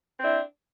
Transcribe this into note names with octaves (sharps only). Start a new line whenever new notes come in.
C4 D4 E4